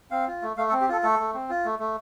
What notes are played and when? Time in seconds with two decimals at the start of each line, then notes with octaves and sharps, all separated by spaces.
0.11 C4 F5
0.27 F4
0.42 A3
0.57 A3 F5
0.69 A4
0.72 C4
0.81 G4
0.89 F4 A4
1.03 A3 A4
1.19 A3
1.34 C4
1.50 F4
1.65 A3
1.79 A3